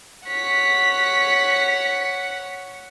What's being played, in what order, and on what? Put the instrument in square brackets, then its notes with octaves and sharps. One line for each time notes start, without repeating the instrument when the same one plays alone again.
[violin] C#5 F#5 [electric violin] B6